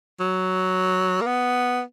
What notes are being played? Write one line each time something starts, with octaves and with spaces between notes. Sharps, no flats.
F#3
A#3
B3